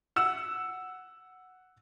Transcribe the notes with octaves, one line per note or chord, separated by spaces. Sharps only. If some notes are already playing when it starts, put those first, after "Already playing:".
F#5 E6 E7